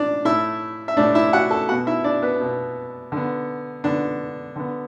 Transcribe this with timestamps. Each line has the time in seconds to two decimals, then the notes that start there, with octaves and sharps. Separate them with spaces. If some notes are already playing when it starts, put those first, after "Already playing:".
Already playing: A2 E3 A3 D4 D5
0.25 A2 A3 E4 E5
0.88 E5
0.97 A2 A3 D4 D5
1.15 E4 E5
1.33 F#4 F#5
1.51 A4 A5
1.68 B3 F#4 F#5
1.71 B2
1.87 E4 E5
2.04 D4 D5
2.22 B3 B4
2.40 B2 B3
3.12 D3 B3
3.84 D3 B3 D4
4.56 D3 B3